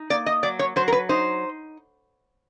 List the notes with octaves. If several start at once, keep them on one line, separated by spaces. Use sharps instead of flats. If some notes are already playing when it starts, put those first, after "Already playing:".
Already playing: D#4
A#3 D5
D#5
F#3 D5
C#5
F#3 C5
A#4
B4
D#4 C5